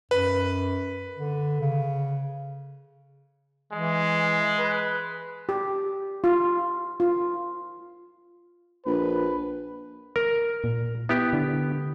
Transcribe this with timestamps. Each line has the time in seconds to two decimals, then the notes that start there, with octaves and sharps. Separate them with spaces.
0.11 F#2 B4
1.17 D3
1.61 C#3
3.73 E3 G#3
4.58 B4
5.49 G4
6.24 F4
7.00 F4
8.86 A#1 B4
10.16 A#4
10.64 A#2
11.09 B3 E4 G4
11.33 D3